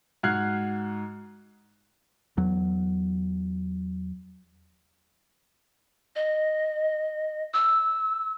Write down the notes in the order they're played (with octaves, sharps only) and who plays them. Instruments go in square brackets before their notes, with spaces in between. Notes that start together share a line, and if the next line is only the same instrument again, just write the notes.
[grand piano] G#2 F#4 F6 F#6 G#6 C7
[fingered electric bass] E2 F#3
[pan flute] D#5
E6